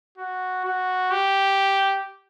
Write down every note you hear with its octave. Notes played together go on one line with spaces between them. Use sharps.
F#4
F#4
G4